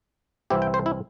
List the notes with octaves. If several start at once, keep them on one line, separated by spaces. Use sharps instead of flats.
C2 C3 E3 C4 E4 G4
G5
C5
E4